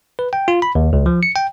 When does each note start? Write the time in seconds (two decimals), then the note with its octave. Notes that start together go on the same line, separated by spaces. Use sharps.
0.19 B4
0.33 G5
0.48 F4
0.62 B5
0.75 D#2
0.93 C#2
1.06 F3
1.23 C#7
1.36 G5